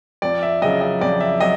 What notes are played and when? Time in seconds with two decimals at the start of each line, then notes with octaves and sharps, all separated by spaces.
0.22 F2 D5
0.43 E5
0.62 C#3 F#3 D#5
0.81 D#5
1.01 F2 D5
1.20 E5
1.40 F#3 D#5